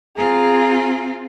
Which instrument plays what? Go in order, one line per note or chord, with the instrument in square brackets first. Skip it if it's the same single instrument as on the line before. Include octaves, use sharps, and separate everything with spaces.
[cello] C4 F4 [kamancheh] G#4 A#5